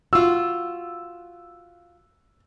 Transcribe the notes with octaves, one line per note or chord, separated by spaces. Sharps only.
F4 F#4 E6